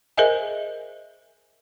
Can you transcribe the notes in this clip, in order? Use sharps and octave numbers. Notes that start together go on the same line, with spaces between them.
G#4 A#4 C5 D#5 E5 G#5